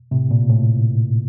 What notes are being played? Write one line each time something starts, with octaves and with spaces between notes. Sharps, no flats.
A2 C3
A#2
A2